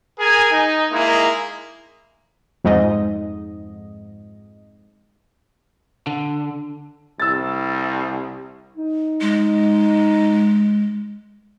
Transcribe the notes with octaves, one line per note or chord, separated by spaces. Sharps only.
G#4 A#4 G#5
D#4
G#3 A#3 D#4 E4 G#4
F2 G#2 D#5
D3
C2 E6 A6
D#4
G#3